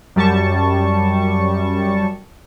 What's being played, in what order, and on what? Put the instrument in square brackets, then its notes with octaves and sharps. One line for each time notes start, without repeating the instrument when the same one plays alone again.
[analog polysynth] F#2 G3 A5 C#6